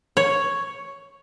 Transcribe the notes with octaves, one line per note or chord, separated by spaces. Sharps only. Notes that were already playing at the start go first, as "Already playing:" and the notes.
C#5